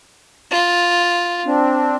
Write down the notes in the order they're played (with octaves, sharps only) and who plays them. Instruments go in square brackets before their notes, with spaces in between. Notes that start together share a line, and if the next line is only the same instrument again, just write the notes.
[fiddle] F4
[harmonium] C4 D4